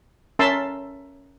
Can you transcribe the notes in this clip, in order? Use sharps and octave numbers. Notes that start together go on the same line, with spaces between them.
C#4 A#4 E5 A5 C6 E6